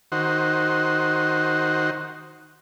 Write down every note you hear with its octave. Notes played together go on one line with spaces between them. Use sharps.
D#3 F#4 C5